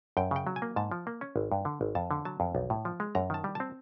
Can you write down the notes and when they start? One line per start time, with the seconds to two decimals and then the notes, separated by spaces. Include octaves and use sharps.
0.17 F#2 G5
0.31 C#3 G5
0.47 F#3
0.56 G#5
0.62 A#3
0.76 G#2 A5
0.91 F3
1.07 A#3
1.21 C#4
1.36 G#1
1.52 G2
1.65 D3
1.81 G#1
1.95 F2 A5
2.11 D3
2.25 F#3 A5
2.40 F2
2.55 B1
2.70 A2
2.85 F3
3.00 G#3
3.15 F#2 A#5
3.30 D#3 A5
3.44 G3
3.55 C4 A5